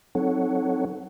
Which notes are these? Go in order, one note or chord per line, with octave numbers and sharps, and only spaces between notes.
F#3 C4 D#4 A4 C#5 F#5